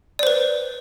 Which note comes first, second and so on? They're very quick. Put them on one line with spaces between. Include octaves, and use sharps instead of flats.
D5 C5 B4